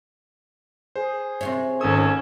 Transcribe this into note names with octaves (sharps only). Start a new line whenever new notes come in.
G#4 C5
C3 F4 C#5
G#1 C#4 A4 D#6 E6